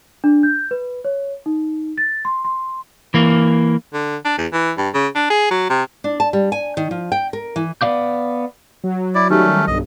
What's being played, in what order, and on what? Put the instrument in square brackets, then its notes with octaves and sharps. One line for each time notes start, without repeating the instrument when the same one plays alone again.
[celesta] D4
G6
B4
C#5
D#4
A6
C6
C6
[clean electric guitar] E3 A#3
[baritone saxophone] D3
D4
E2
E3
G2
C#3
D4
G#4
F#3
C3
[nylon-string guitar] D4
A5
G3
G#5
D#3
F3
G5
A#4
E3
[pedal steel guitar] B3 D5 F5 D6 G6
[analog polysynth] F#3
[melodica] E4 D5
[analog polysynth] D#3 F#3 G3 [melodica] A3 C#4
[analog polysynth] B1 G2 [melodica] D#5